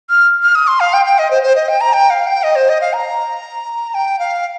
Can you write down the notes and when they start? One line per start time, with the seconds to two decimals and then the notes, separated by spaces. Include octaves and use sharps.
0.10 F6
0.43 F6
0.55 D#6
0.68 C6
0.80 F5
0.94 G5
1.06 G5
1.19 D#5
1.31 C5
1.43 C5
1.56 D#5
1.69 G5
1.81 A#5
1.93 G5
2.10 F5
2.27 G5
2.43 D#5
2.56 C5
2.69 D#5
2.81 F5
2.93 A#5
3.94 G5
4.19 F5